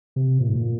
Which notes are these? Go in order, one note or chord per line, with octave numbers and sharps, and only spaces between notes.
C3
A#2
G#2
A#2